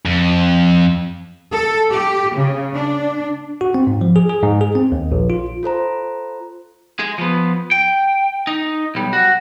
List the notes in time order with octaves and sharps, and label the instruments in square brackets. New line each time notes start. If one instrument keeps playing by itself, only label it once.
[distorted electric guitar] F2
[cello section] A4
G4
C#3
D4
[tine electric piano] F#4
C4
G#2
F3
G#4
G#4
G#2
G#4
C4
D#2
A#1
F4
[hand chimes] F4 A4 C5 A#5
[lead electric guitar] G#3 G#4
F3 B3
G5
D#4
B1 G3
F#4